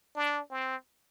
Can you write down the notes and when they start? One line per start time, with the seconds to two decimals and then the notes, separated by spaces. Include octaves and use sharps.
0.15 D4
0.51 C4